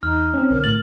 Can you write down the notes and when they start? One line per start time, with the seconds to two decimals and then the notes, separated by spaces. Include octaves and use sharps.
0.03 E2 D#4 F6
0.34 C4 C#4
0.51 B1 D3 A#4
0.64 A2 A6 F#7